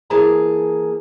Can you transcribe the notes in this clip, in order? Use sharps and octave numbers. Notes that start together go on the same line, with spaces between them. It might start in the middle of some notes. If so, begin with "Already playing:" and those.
E3 A#3 G#4 A5 A#5